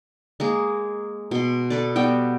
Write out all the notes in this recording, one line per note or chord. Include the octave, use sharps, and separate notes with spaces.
G#3 A#3 G#4
B2 C6
A4 B4 D5
G3 B3 F#4 G5